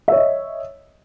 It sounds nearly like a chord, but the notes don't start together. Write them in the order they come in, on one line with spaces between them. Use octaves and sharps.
E5 C#5 D#5